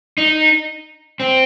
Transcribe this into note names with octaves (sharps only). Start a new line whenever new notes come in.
D#4
C4